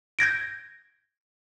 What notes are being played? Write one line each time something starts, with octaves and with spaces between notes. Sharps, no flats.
G6 G#6 A#6 D7